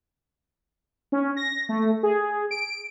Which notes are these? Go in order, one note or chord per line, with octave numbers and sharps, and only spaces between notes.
C#4
A#6
A3
G#4
D7